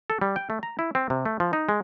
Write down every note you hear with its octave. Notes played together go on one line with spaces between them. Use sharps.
A4
G3
G5
A3
A#5
E4
C4
C3
A3
F3
D#4
G#3